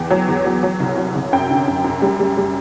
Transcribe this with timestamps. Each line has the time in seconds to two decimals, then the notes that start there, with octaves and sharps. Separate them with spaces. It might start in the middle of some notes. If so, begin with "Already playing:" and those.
Already playing: E2 G5
0.11 F#3
0.28 E2
0.46 F#3
0.63 F#3
0.80 C2
0.98 F#3
1.15 C2
1.32 F#2 G5
1.50 D3
1.68 F#2
1.84 F#2
2.02 G3
2.20 G3
2.37 G3